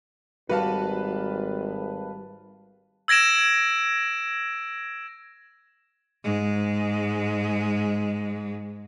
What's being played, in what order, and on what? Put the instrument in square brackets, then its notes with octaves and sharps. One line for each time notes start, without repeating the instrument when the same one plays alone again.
[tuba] G#1 [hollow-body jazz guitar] G3 F#4 [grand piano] B4 F5 A5
[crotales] E6 G#6 A#6 D7 E7
[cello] G#2 G#3